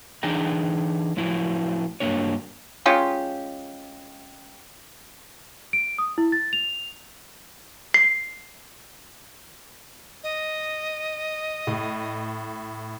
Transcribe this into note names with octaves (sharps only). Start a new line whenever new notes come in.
E3 D4 D#4 G#4 G5 A#5
A2 F3 F#3 E4
G2 C3 F#3 A#3 D4 C#5
G#3 C#4 F4 G4
D7
D#6
E4
A6
F7
C7
D#5
A2